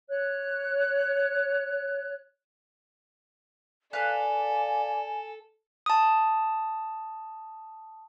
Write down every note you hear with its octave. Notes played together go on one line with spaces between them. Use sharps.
C#5 F#6
A4 B4 D5 F5 G#5 F#6
A5 D#6